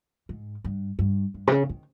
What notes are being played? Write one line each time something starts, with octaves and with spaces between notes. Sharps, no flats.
G#2
G2
G2
G2
C3
C#3
D#3